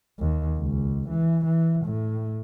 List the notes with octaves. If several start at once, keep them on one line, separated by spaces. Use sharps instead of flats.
D#2
C#2
E3
E3
A2